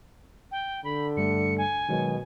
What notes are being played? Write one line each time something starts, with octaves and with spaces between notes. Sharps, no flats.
G5
D3 B5
G2 G3 A3 C#7
G#5
B2 D#3 F#3 G#3